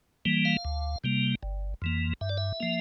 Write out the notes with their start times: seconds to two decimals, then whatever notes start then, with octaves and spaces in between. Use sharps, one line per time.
0.25 E3 G3 A#3
0.45 F5
0.65 D2
1.04 C3 G3 A#3
1.43 G1
1.82 F2 E3 A#3
2.21 G2 E5
2.29 D5
2.37 E5
2.60 F3 A#3